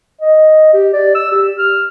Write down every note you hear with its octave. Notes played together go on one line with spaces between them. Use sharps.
D#5
G4
D5
E6
G4
F6